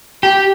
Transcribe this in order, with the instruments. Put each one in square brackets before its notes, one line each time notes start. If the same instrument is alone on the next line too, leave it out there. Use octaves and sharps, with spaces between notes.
[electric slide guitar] G4